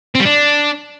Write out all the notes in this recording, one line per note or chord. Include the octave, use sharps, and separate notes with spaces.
C4
G3
D4